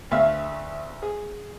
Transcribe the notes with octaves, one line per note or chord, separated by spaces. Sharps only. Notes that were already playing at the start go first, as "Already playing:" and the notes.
D2 A3 E5 F5
G#4